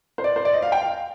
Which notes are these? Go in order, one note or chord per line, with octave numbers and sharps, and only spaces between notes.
C5
D5
C5
D5
D#5
F5
G5
F5